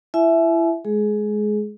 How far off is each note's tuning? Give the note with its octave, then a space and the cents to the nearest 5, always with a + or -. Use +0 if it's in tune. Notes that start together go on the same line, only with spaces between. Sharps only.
E4 +25 E5 +0 G#5 +45
G#3 +15 G#4 +20